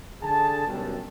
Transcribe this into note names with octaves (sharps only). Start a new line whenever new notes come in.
D3 G#4 A5
F#2 B2 D3 D#3 G3